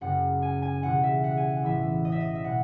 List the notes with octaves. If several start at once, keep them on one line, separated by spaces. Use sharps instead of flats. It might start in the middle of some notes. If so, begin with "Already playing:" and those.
F#1 F#2 C#3 F#5
G#5
G#5
E1 D#2 C#3 F#5
E5
F#5
G#5
F#5
A1 A2 E3 B3 E5
D#5
E5
D#5
E5
B2 F#3 F#5